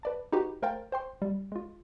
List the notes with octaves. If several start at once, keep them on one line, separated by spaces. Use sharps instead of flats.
B4 D5 A5
D#4 F#4 G4 B4
A3 A#4 C5 F5 G5 A6
C5 G5 C6
G3
G#3 F4